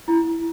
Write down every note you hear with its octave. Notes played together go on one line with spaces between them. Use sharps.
E4